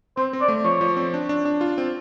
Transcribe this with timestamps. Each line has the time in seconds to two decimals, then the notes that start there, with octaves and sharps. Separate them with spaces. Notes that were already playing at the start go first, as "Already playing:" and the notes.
0.17 C4 C5
0.33 C4
0.41 D5
0.48 A3
0.64 F3 C#5
0.81 F3
0.97 C4
1.14 D4
1.29 D4
1.45 D4
1.61 F4
1.78 C4